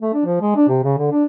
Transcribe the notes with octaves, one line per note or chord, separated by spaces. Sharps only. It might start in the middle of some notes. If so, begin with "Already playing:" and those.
A3
D4
F3
G#3
D4
C3
C#3
D3
D4